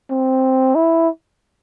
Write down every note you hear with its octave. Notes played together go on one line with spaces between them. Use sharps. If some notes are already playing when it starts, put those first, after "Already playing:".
C4
E4